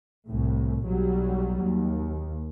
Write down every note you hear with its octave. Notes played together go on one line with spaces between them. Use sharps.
C2 A2
B1 F#3 G3
D#2